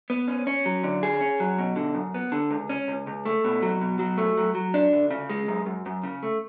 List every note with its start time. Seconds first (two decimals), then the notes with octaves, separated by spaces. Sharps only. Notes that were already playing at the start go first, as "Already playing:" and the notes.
0.10 B3
0.28 C#4
0.47 C#4
0.66 F#3
0.84 D3
1.03 G#4
1.20 C#4
1.40 F#3
1.58 B2
1.76 D3
1.95 F#2
2.14 B3
2.32 D3
2.50 C#2
2.69 C#4
2.88 C#2
3.07 C#2
3.25 A3
3.45 B2
3.62 F#3
3.81 B2
3.99 F#3
4.18 A3
4.37 F#3
4.55 F#3
4.74 D4
4.92 D2
5.11 C#3
5.30 G#3
5.48 F#2
5.66 F#2
5.86 F#2
6.03 C#3
6.23 A3